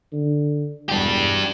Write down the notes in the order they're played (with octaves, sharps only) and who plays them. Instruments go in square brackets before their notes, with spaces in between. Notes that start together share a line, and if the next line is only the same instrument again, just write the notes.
[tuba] D3
[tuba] E1 [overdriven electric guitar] D4 G4